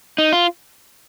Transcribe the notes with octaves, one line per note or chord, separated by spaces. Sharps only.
D#4
F4